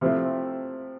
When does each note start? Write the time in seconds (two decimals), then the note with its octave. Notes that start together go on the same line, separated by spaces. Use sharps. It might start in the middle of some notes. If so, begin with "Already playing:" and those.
0.01 C3 F3 A3 C4 E4